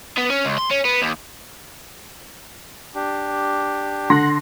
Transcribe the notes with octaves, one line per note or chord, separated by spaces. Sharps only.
B3
C#4
C#2
C6
C#4
B3
D#2
D4 G4
D3 F#5 C6 A#6